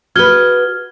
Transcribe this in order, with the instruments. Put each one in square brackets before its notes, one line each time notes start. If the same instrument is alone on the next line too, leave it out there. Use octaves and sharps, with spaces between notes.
[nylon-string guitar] F#4 G#4 B4 [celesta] F6 G#6 G7